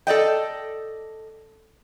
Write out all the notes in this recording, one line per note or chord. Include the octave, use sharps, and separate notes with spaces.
A4 D5 D#5 G5